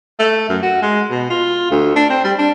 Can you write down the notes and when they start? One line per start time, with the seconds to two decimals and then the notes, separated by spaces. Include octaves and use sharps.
0.19 A3
0.49 F#2
0.62 F#4
0.82 G#3
1.10 B2
1.30 F4
1.71 D2
1.96 D4
2.10 C4
2.24 G3
2.39 D4